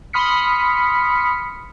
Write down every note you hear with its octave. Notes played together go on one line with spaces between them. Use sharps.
B5 C6 D#6 F6 B6 C#7